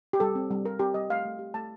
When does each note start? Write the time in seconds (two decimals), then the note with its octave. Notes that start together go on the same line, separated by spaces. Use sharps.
0.13 G4
0.20 G3 A4
0.35 C4
0.51 G3
0.65 G3 A#4
0.79 C4 G4
0.94 G3 D#5
1.10 A3 F5
1.25 A3
1.39 G4
1.54 A3 A5